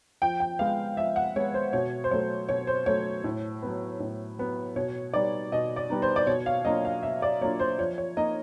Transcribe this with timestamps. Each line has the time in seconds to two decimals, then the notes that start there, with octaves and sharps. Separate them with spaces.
0.22 F3 G5
0.40 G5
0.59 G#3 B3 F5
0.97 F3 E5
1.16 F#5
1.36 G#3 B3 C#5
1.54 C5
1.73 B2 C#5
2.04 C5
2.11 F#3 A3 C#5
2.49 B2 C#5
2.67 C5
2.86 F#3 A3 C#5
3.24 A2
3.62 F#3 B3
4.00 A2
4.39 F#3 B3
4.76 B2 C#5
5.14 G3 B3 D#4 D5
5.52 B2 D#5
5.76 D5
5.90 G3 B3 D#4
6.02 C5
6.16 D5
6.27 B2 C#5
6.46 F5
6.65 F#3 A#3 D4 F4 D#5
6.85 F5
7.03 B2 E5
7.22 D5
7.41 F#3 A#3 D4 F4 C#5
7.60 C5
7.78 F3 C#5
7.98 C#5
8.17 A#3 D#4 D#5